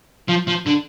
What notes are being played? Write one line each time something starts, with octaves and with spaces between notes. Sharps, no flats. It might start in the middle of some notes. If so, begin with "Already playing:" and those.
F3
F3
D3